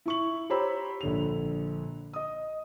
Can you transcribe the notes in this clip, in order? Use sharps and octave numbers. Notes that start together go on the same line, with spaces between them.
E4 C#6 F#7
G4 C5 C#5 A#5 B5 E6
A#1 D3 F7
D#5 D#6